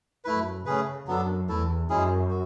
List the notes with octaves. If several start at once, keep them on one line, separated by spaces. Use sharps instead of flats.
F#2 A3 E4 B4
C#3 A3 C#4 G#4 B4
F#2 F#3 B3 D4 A4
E2 A3 E4 A4
F#2 G#3 C#4 E4 G#4
F#4